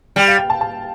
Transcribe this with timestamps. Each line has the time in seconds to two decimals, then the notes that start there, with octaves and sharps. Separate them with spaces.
0.16 G3 G5
0.28 F5
0.38 G5
0.50 A5
0.61 A5